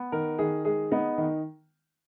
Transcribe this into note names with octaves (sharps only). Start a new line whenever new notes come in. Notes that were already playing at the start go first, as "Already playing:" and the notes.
Already playing: B3
D#3 A#4
D#3 G#4
G#3 G#4
B3 D#4
D#3